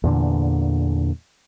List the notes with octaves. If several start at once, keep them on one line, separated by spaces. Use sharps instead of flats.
E2 A#2 D3